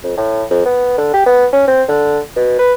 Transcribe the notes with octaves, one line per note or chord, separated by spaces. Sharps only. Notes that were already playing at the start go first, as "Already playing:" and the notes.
F2
A2
F2
B3
D3
G4
B3
C#4
C4
D3
B2
B4